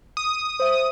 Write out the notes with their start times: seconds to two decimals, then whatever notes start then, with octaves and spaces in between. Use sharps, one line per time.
0.17 D#6
0.59 C5 E5